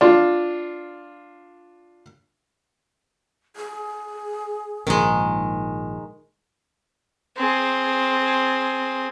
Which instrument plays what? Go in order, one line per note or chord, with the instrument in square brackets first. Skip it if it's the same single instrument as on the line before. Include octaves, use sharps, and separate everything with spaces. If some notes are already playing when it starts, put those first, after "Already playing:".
[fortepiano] D4 F4
[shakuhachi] G#4
[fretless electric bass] A#1 G#2 [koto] D#3 G#3 [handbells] A#4
[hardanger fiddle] C4 G#4